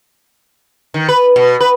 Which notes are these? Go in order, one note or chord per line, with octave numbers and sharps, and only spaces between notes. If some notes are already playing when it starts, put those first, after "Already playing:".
D#3
B4
B2
B4